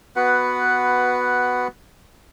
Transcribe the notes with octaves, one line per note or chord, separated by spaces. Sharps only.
B3 F#4 B4 F#5